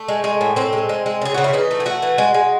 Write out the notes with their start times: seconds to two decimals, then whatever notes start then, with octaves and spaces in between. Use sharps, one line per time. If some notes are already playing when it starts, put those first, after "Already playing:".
Already playing: A3
0.08 G#3
0.24 G#3
0.41 A2
0.56 A2 C4
0.73 G#3
0.89 G#3
1.06 G#3
1.21 C#3 G#4
1.34 C#3 F#4
1.44 E4
1.53 E3 D#4
1.71 A3
1.80 G#4
1.86 A3 F#4
2.02 E3
2.18 G#3
2.34 G#3